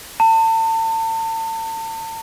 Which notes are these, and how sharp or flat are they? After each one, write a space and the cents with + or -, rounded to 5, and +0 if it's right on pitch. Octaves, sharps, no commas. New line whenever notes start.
A5 +35